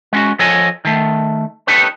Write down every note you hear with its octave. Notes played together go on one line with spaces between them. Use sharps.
G#3 C#4 F#4
F3 A4 C#5 D#5 G#5
D#3 A3
D#4 G4 A4 B4 C#5